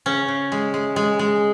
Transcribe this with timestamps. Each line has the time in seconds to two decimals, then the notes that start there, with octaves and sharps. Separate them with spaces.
0.06 C#3 C#4
0.28 C#3
0.52 G#3
0.74 G#3
0.96 G#3
1.19 G#3